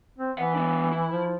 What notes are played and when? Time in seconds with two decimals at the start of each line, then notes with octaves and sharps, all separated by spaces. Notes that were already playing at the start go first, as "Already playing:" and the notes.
0.18 C4
0.38 E3 B4 F#5
0.54 B3 D4
0.92 E4
1.11 F3